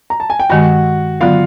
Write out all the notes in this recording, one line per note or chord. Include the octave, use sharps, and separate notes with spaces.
A#5
A5
G#5
G5
G2 D#3 G#3 F#4 F#5
D3 F#3 B3 F4 F5